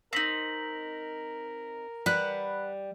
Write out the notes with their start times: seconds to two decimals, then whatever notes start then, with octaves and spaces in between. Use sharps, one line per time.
0.13 C4 D#4 A#4 A#6 B6 F#7
2.06 G3 B4 F#5 B5 F#6